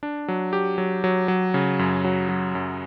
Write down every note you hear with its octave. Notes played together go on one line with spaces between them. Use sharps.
D4
F#3
G4
F#3
F#3
F#3
C#3
F#2
F#3
F#3
F#2